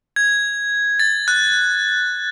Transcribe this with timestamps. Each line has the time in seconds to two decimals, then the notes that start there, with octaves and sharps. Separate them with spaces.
0.16 G#6
1.00 A6
1.28 F#6